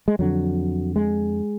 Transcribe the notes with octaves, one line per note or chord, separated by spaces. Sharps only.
G#3
F2 D3 F#3
G#3